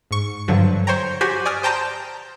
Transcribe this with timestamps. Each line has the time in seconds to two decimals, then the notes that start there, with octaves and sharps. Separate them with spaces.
0.11 G#2 C#6
0.48 G2 D3 F3 F#3
0.87 C5 C#5 G5 A#5
1.21 F#4 G4 C5 G#5
1.45 D5 G#5 D#6 F6
1.63 C5 G5 A5 A#5 C6 G6